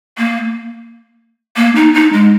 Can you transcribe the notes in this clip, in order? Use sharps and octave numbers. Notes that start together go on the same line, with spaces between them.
A#3
A#3
D#4
D#4
G#3